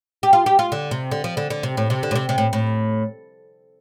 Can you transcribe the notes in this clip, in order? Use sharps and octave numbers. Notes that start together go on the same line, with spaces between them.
G4
F4
G4
F4
D3
C3
D3
F3
D3
D3
C3
A2
C3
D3
A2
C3
C3
A2
A2